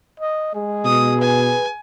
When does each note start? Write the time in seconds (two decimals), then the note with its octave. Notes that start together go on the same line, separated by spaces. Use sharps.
0.20 D#5
0.55 G#3 G#4
0.85 B2 D#6
1.20 B4 G#5